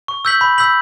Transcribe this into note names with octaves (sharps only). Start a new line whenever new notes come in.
C#6
E6 G6 B6 F#7
B5
E6 G6 B6 F#7